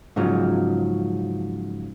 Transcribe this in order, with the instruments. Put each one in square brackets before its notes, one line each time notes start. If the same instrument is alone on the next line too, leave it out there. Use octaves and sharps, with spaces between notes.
[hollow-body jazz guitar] G#2 C#3 F3 F#3